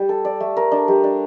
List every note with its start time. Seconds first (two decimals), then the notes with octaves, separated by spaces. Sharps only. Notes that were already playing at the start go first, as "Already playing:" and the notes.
Already playing: G3
0.09 A4
0.25 D5
0.40 A3
0.57 A#4
0.72 D4
0.88 G3
1.04 D4